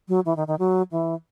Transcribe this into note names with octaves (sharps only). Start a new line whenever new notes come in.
F#3
E3
D#3
D#3
F#3
E3